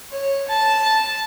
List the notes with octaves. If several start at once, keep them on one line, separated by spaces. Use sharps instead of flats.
C#5
A5